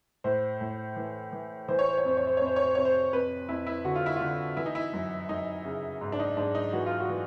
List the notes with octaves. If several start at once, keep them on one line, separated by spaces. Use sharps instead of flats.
A2 C5
A2
E3
E3
E3 C5
C#5
C5
C#5
F2 C5
C#5
C5
F2 C#5
C5
C#5
C5
C3 C#5
C5
F2 B4
F2 E4
E4
D3 F#4
F4
E4
D3 F4
E3 E4
D#4
E4
F#2
F#2 D#4
C#3
G#2
D4
D#4
G#2 D4
D#4
E3 F#4
F4
F#4
E3